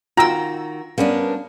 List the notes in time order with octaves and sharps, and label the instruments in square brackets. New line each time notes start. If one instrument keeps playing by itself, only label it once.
[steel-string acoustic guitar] D#3 F#4 [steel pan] F4 G5 E6 [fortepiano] A#5
[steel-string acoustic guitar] G3 D4 [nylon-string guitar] A#3 B3 C#4